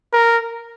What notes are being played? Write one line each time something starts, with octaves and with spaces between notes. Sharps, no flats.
A#4